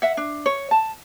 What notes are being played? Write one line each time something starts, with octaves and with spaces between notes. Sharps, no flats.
E5 F#5
D4
C#5
A5